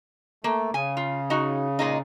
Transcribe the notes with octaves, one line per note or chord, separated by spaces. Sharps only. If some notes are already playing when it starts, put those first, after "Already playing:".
A3 A#3
C#3 G#5
F4
D#4 F#4
A#2 G#3 D#4